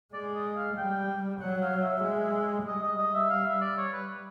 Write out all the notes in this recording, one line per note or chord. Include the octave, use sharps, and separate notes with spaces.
G#3 D5
D#5
F5
G3 G5
F#3 F#5
F5
E5
G#3
G3 D#5
D#5
D#5
E5
F5
E5
D5
C#5
B4